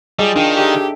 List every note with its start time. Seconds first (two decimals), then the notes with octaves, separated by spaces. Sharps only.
0.19 G3 F4 G#4 D#5 A5
0.36 D#3 D4 F5 G5
0.57 G#2 G#3 G4 A4 E5 G5